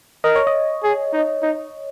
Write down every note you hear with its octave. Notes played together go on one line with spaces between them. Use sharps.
A#4 D#5
C#5
D#5
G#4
D#4
D#4